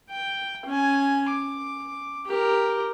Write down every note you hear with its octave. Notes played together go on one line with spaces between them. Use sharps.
G5
C#4 G#5
D6
G4 A#4